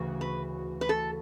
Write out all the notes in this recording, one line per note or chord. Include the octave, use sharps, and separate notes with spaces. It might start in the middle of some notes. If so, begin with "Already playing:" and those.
Already playing: D2 C#3 E3 F#4
B4
B4
A4